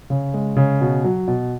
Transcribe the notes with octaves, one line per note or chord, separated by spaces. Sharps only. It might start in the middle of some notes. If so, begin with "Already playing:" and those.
C#3
G#3
C#3
B2
F#3
B2